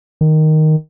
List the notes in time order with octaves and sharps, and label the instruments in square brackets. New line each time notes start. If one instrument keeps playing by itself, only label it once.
[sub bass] D#3